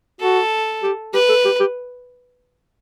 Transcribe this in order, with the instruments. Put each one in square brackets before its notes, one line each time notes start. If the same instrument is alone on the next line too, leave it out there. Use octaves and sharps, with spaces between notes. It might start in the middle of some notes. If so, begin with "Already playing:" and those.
[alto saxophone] F#4 [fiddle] A4
[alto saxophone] G4
[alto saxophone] G4 [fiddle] B4
[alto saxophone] A4
G4
G4